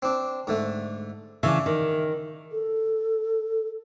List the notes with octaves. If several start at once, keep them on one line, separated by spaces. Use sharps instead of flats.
C4 D4
G#2 D3 A3
C#3 E3 D4 E5
D#3
A4